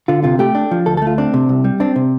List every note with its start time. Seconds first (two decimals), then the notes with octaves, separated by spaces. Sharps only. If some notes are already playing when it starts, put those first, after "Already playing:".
0.08 D3 F4
0.24 C3 F4
0.39 A3 G4
0.55 D4
0.71 F3
0.86 D2 A4
0.97 A4
1.02 A3 F4
1.18 C4 D4
1.34 C3
1.49 C2
1.64 G3
1.80 C4 D4
1.96 C3